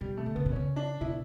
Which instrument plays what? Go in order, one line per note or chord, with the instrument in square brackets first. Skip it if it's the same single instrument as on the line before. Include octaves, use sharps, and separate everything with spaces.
[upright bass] B2 [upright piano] G3
[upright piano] A3
[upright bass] D3
[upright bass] C#3 [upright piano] B3
[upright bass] B2
[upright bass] C#3 [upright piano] C#4
[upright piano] D4
[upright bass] B2 [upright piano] E4